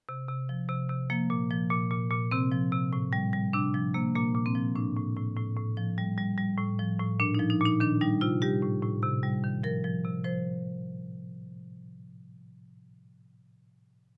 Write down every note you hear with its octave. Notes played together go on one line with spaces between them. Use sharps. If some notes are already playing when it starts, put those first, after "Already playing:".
C3
C3
F3
C3
C3
F3 A#3
A#2
F3
A#2
A#2
A#2
C3 C4
F3
C3
A2
G3
G3
C3 D4
F3
C3 A#3
A#2 A#3
A#2
C4
F3
A2 D4
A2
A2
A2
A2
F3
G3
G3
G3
A2
F3
A2
A#2 D4
D#4
F3
D#4
A#2 D#4
D#3 D4
G3 D#4
C3 F4
G3 G4
A2
A2
C3
G3
D#3
F3 A#4
F3
C3
F3 C5